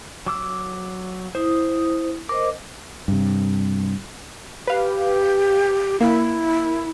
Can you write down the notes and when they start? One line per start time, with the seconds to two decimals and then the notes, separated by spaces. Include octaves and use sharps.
0.26 F#3 D6 E6
1.35 E4 C5 D#6
2.29 A#4 C5 D#5 D6
3.08 G2 C3
4.67 G4 B4 F5
6.01 A#3 E4